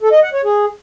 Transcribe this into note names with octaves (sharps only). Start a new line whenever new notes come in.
A4
D#5
F#5
C#5
G#4